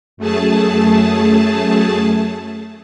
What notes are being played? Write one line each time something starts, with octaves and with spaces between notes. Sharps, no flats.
F#2 A3 G#4 A5